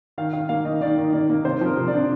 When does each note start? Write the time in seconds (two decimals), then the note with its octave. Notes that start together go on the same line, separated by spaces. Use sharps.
0.18 D#3 F5
0.33 D#3 F5
0.49 A#3 F5
0.65 D#3 D#5
0.81 D#3 D5
0.98 D#3
1.13 A#3 D5
1.30 A#3
1.45 C3 C5
1.61 F3 A#4
1.77 C3
1.88 D5
1.93 D4